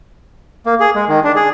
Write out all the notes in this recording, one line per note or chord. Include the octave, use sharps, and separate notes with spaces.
A#3
G#4
G#3
D#3
D4
G#4